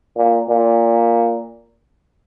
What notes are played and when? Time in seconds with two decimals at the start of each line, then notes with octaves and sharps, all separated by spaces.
0.17 A#2
0.49 A#2